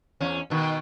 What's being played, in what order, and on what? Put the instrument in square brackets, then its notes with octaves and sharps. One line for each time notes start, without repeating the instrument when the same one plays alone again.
[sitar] E2 C#4
B2 D#3 B3